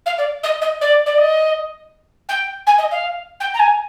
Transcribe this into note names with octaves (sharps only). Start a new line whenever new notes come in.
F5
D5
D#5
D#5
D5
D5
D#5
G5
G#5
D#5
F5
G5
A#5
G#5